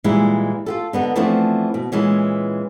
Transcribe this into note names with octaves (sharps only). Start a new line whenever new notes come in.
A#2 E3 G3 G#3 D#4 E4
F4 G4 A4
D3 B3 D#4
E3 F3 A3 B3 C4 D4
B2
A#2 E3 G#3 C#4